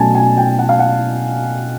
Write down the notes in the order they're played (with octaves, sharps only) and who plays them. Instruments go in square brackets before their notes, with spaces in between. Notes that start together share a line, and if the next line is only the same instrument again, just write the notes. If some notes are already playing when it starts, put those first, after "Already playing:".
Already playing: [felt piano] B2 F#3 A3 C#4 G#5 A5
G#5
G5
F#5
F5
F#5